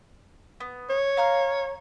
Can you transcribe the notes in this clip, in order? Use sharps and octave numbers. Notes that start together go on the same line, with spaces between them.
B3
C#5
F5 A#5 F6